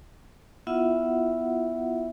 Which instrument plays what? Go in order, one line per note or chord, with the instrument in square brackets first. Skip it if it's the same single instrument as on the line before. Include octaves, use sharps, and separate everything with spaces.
[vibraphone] B3 E4 F4 E5 F#5